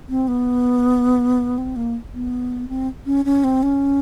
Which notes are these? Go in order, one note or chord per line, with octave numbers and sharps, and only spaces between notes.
C4
B3
C4
A#3
B3
C4
C#4
C#4
C4
C#4